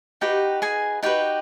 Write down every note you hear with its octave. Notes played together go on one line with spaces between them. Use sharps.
D#4 F#4 G4 B4 G5
G#4 G#5
D#4 F#4 G4 B4 G5